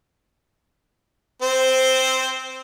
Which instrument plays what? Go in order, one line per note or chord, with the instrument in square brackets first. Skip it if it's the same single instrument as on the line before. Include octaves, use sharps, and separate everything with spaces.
[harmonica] C4 C5